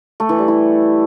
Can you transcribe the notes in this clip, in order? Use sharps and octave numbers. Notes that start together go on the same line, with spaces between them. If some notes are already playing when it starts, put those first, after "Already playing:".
A3
E3
G3
E4